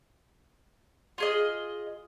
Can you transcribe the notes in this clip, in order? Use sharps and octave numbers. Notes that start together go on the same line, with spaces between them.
F4 G#4 D#5